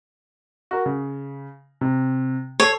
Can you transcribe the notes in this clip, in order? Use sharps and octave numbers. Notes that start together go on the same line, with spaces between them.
F#4 A#4
C#3
C3
A4 C#5 C7